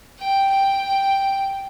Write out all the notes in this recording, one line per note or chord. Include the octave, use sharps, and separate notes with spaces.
G5
G5